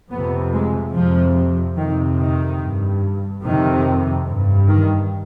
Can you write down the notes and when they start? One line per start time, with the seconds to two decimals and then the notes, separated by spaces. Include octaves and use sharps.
0.11 F2 C3 B3
0.53 G#3
0.95 F2 C3 F3
1.77 F2 C3 D#3
2.19 D#3
2.61 G2
3.44 F2 C3 D#3
4.27 G2
4.69 D#3